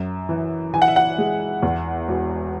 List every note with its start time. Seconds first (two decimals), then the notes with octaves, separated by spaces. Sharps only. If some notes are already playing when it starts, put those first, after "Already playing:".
Already playing: F#2
0.29 E3
0.74 E3 G#5
0.82 F#5
0.88 E5
0.96 F#5
1.18 G#3
1.63 E2
2.08 E1